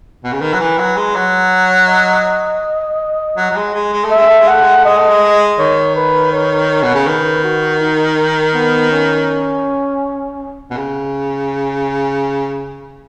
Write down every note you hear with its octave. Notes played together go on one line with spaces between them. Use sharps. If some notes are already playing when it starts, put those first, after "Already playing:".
B2
C#3
D#3 B4
F#3
E3
F#3
G#3
F#3 C#5
D#5
F#3
F#3
G#3
G#3
G#3
A3
E5
G#3
A3
G#3
A3 F#5
G#3
A3
G#3 D#5
A3
G#3
D#3 C#5
B4
C#5
B2
C#3
D#3 B4
F#4
D#4
B3
C#4
B2
C#3